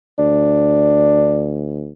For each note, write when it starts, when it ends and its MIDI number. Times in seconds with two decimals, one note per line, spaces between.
0.19 1.91 38
0.19 1.54 62